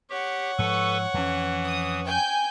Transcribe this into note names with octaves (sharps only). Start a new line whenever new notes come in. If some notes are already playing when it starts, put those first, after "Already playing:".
G4 C#5 F#5
G#2 F3 A4 B4 C#6
F2 E3 C#4
D#6
G5 G#5 G6